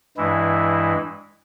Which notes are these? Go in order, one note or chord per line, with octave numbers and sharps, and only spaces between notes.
G2 E3 G#3 E4